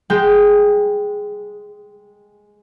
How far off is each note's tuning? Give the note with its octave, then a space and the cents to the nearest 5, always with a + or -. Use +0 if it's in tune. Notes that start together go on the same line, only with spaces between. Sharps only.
G#3 +0 G5 +0